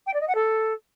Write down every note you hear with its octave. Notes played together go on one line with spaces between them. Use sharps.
G5
D5
D#5
F#5
A4